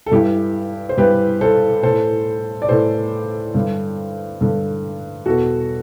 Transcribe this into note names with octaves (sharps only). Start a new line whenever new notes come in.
A4
G2 E3 E4 G4
C5
G2 E3 G4 B4
A4 C5
A2 E3 A4 C5
D5
A2 E3 A4 C5
G2 D3
G2 D3
E2 B2 F#4 A4